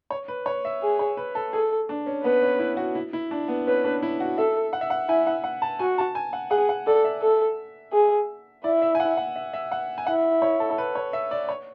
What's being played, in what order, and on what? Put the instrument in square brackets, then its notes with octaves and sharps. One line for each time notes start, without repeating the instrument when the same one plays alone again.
[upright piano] C#5
B4
C#5
E5
[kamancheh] G#4
[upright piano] C#5
B4
A4
[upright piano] G#4 [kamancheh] A4
[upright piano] D4
C#4
[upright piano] B3 [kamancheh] B4
[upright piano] C#4
E4
F#4
E4
E4
D4
B3
[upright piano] C#4 [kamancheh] B4
[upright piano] D4
E4
F#4
[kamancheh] A4 [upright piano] E5
[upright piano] F#5
E5
F#5
[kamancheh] E4 [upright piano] G#5
[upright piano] F#5
F#5
A5
[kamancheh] F#4 [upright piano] G#5
[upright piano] A5
G#5
F#5
[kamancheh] G#4 [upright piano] F#5
[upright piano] F#5
[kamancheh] A4 [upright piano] D5
[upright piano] E5
[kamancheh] A4
G#4
[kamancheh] E4 [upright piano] D5
[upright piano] E5
G#5
F#5
F#5
E5
E5
F#5
G#5
[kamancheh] E4 [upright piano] F#5
[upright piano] C#5
A4
A4
B4
C#5
E5
D5
C#5